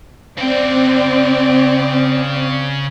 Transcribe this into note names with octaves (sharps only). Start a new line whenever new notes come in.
C#3 C4 D5 G5